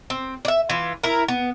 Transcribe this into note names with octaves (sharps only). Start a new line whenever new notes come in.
C4
D5 E5
E3 F4
E4 A#4
B3